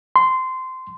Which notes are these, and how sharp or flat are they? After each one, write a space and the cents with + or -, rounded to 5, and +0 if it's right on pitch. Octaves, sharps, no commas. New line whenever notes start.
C6 -15